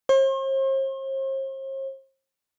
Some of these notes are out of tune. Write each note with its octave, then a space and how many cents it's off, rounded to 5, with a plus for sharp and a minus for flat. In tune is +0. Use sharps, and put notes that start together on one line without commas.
C5 +45